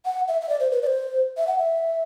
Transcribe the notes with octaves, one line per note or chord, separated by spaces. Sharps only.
F#5
E5
E5
D5
C5
B4
D5
C5
E5
F#5
E5